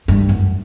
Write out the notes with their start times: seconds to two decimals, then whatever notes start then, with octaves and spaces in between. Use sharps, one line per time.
0.08 G2
0.29 F#2